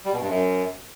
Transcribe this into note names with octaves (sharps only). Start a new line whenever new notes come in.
G3
B2
G2
F#2